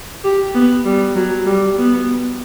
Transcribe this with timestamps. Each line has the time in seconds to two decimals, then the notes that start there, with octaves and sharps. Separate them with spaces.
0.24 G4
0.54 B3
0.85 G3
1.15 F#3
1.46 G3
1.78 B3